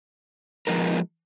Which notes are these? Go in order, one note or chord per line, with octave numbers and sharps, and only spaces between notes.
F3 G#3 B3 D#4 A#4